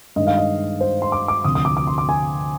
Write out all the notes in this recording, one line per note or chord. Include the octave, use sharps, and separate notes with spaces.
G2 D#3 G#3 D#5
F5
D#5
C5
C6
D6
D6
D2 C3 F3 D#6
D#6
D6
D6
C6
D6
G#5